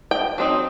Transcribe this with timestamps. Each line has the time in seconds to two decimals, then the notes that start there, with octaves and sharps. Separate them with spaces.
0.11 G5
0.38 F#3 C4 D#4